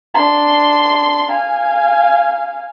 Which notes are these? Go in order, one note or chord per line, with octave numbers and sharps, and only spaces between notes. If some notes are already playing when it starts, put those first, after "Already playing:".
D4 C6
F5 G#5